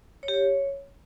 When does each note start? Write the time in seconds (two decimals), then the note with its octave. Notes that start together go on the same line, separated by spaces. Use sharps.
0.23 C#5
0.28 G4
0.34 C#5